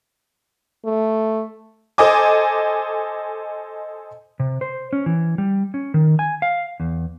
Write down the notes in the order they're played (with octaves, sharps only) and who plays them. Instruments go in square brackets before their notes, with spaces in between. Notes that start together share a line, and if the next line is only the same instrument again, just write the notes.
[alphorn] A3
[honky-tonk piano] A4 C5 D#5 G#5 D6
[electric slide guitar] C3
C5
C#4
E3
G3
C#4
D#3
G#5
F5
E2